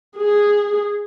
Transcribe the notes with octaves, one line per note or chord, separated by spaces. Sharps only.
G#4